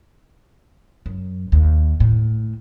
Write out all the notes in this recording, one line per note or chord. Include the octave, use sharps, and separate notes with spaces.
F#2
D#2
A2